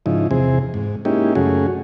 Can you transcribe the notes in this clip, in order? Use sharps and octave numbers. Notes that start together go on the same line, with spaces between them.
G#2 C#3 F3 D#4 E4
E2 C3 C4 G#4
G#2
G#3 A#3 C#4 D#4 E4 G4
F#2 C#3 A3 C#4 F#4 G#4